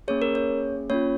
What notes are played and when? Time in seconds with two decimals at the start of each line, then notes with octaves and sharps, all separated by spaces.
0.08 A#3 C#4 G#4 C#5
0.22 A#4
0.35 C#5
0.90 A#3 C#4 F4 C#5